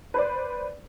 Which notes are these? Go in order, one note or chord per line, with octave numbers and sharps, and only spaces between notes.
B4 C5 D5